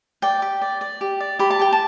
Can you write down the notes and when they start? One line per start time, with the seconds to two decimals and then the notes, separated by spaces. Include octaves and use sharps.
0.22 D5 G5
0.42 G4
0.61 D5
0.81 D5
1.01 G4
1.20 D5
1.39 G4 B5
1.51 A5
1.59 G4 G5
1.72 A5